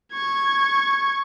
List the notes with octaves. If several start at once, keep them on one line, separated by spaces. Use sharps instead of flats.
C#6 G#6